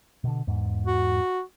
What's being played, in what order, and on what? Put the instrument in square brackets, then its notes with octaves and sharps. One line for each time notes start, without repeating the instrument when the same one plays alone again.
[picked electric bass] B2 D3
E2 G#2
[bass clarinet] F#4